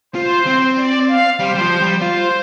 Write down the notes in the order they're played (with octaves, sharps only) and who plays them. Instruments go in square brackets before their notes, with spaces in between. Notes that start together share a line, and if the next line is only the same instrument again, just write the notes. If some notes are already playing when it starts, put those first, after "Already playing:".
[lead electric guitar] F4 [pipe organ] C5
[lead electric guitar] C4
[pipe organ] D5
F5
[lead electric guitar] G3 [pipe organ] C5
[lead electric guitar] G3
F3
G3
[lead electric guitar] F4 [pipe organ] C5